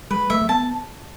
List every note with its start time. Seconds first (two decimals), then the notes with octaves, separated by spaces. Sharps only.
0.11 G#3 B4
0.30 A3 E5
0.42 A3
0.49 B3 A5